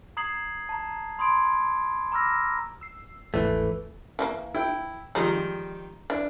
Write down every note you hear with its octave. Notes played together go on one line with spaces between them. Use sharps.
A#5 D#6 G#6 C7 F#7
A5 A#5
B5 C6 D#6 G#6 D7
A#5 B5 D6 E6 F6 A#6
E6 C7
G1 D#2 G#2 E3 A3
E3 A3 A#3
E4 G5
D#3 F3 G3 G#3 D#4
E3 D4